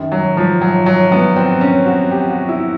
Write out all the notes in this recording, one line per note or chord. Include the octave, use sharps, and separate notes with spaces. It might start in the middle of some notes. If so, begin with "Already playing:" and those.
Already playing: F#2 D#3
F#3
F3
F#3
F#3
B3
C4
C#4
F#4
G4
F#4
E4